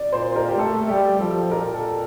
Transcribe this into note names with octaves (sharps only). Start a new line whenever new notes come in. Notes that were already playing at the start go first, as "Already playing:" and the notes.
Already playing: D5
A#2 C5
A#4
G4
A3 A4
G3 G4
F3 A4
A#2 A#4
A4